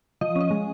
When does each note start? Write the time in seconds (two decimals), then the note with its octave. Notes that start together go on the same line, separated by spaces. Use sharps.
0.21 F3 D#5
0.36 C#4
0.41 D#5
0.51 G#3